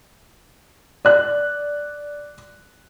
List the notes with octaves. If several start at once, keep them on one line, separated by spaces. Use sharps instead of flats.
D5 F#6